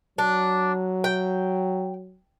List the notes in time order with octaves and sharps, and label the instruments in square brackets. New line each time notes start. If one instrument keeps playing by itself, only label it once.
[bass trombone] F#3 [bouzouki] D4
[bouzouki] G5